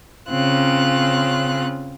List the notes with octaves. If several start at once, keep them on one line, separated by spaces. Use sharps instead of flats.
C#3 C4 C#4 F4 F#6